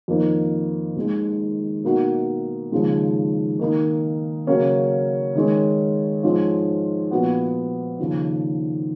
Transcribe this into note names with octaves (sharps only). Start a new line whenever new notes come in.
F2 D#3 A#3 D#4
D#2 D#3 G#3
B2 A#3 D#4 F#4
D#2 C#3 F3 G#3
D#3 A#3 D#4
C#3 F#3 A#3 C#4
D#3 G#3 C#4
G#2 F3 G#3 C#4 F4
A#2 F3 B3 F#4
D#2 C#3 F3